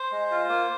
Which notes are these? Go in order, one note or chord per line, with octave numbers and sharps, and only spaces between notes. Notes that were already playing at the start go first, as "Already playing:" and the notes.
Already playing: C5
G#3
F4
A#3